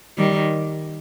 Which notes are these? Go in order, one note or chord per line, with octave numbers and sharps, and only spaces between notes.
D#3 G3